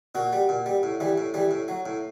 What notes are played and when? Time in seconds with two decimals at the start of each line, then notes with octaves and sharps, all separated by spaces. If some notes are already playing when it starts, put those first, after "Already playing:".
0.15 A#2 F#4
0.33 G3
0.49 A#2
0.66 G3
0.83 A2
1.00 E3 G3
1.18 A2
1.34 E3 G3
1.51 A2
1.68 F#3
1.86 A2